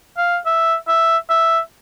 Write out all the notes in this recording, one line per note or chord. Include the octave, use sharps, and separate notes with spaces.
F5
E5
E5
E5